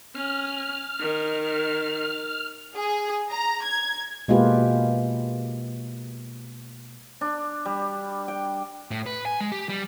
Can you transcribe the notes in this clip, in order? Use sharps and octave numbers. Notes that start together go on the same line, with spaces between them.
C#4 F6
D#3
G#4
A#5
G#6
B2 G#3 A#3 F4 G4 B4
D4
G3
G5
A2
B4
G#5
G#3
G4
G3